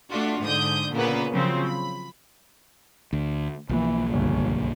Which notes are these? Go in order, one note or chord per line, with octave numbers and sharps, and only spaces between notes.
A3 D4 F4 F#4
G#2 D3 D#6 G6
A#2 C#3 A#3 B3 B4
C#3 F3 F#3 C4
B5
D2
B1 E3 F3 A#3
G1 C#2